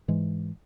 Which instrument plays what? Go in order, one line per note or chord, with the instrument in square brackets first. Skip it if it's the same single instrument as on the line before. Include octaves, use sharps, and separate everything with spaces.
[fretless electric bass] G#2 E3 G#3